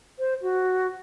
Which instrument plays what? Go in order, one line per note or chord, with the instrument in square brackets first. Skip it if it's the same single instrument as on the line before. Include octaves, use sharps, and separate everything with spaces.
[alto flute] C5
F#4